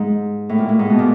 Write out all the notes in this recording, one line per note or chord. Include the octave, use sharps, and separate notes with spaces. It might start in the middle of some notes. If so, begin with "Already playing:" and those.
Already playing: G#2
A2
A#2
A2
G#2
B2
A#2